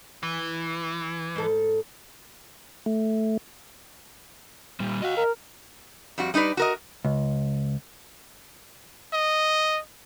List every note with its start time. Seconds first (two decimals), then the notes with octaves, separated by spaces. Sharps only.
0.23 E3
1.36 G#2 A4
2.86 A3
4.80 A#2 G3
5.02 F#4 D#5 F5
5.17 A#4
6.18 F2 G3 F#4
6.34 G3 D#4 F4 B4 D5
6.57 F#4 A#4 D#5
7.05 C#2
9.13 D#5